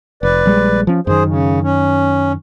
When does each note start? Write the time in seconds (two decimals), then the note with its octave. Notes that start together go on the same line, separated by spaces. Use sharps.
0.23 F1 B4 D5
0.46 A#1 G3 G#3
0.87 F3 C#4
1.07 F#2 D#3 G#4 C5
1.26 C#3
1.63 C#4